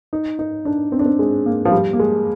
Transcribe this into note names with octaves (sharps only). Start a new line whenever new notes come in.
D#4
D#4
D4
C4
D4
C4
G#3
A#3
F3
G3
A#3
G#3